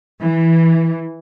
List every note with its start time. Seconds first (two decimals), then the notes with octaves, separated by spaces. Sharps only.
0.22 E3